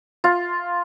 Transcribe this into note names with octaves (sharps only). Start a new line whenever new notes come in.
F4